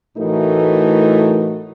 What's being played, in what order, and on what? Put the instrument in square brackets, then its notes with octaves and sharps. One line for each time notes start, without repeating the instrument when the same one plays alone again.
[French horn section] A2 E3 A3 D#4 F#4 A#4